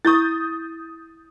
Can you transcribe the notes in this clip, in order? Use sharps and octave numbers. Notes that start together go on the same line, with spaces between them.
E4 C#6 D#6 G6 A6